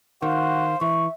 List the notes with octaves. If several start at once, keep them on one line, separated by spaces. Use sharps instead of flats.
D#3 F#4 C5 F5
E3 E5 C#6